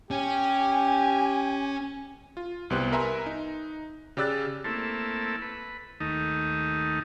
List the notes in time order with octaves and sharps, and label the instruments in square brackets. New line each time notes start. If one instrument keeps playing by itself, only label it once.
[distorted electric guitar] C#4 [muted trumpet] G4 [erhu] G#5
[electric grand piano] F4
C2 B3 G4 C5 F#6
A#4 B4 E5 G#5 A#5 C6
D#4
C#3 G4 D5 E6 F#6 A6
[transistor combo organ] A3 A#3 C4 E4 A4
B4
D#2 D#3 A3 D#4